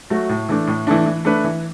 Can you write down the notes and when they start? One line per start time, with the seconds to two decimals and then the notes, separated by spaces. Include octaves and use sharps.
0.10 F#3 A3 F#4
0.29 A2
0.49 E3 A3 D4
0.67 A2
0.87 E3 A3 D4
1.06 E3
1.25 A3 D4 B4
1.44 E3